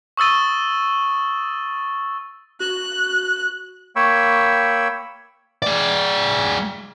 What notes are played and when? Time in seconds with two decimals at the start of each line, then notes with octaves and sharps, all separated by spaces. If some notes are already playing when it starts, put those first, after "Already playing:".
0.17 C#6 D#6 E6 A6 D#7
2.60 F#4 F#6
3.96 A#3 C#5 G5 B5 C#6 E6
5.62 G#3 D5